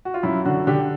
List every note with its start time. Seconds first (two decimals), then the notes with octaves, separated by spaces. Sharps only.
0.05 F#4
0.14 F4
0.23 F#2 E4
0.45 D3 F#4
0.67 D3 G4